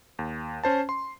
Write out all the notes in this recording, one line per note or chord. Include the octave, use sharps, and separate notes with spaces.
D#2
C#4 C5 A5
C6